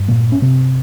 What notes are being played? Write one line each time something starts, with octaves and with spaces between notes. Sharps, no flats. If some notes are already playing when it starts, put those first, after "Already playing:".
Already playing: G2
A#2 A#3
C#4
C3 C4